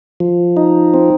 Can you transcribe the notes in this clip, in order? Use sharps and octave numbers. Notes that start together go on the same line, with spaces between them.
F3
D#4
C4